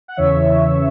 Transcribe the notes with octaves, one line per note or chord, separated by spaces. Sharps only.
F#5
E2 C#3 E3 C#5 E5